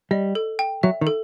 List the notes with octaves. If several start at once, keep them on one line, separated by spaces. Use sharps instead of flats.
G3 D#5
A4
G5
F#3 E5
D#3
A4